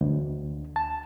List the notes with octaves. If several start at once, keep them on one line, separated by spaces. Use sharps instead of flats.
D2
A5